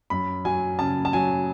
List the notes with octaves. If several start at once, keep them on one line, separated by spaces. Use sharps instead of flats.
F#2 B5
F#3 G#5
C#3 A5
A5
F#3 G#5